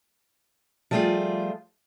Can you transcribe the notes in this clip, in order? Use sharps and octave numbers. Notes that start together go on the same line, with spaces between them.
F3 G3 A3 B3 F4 G#4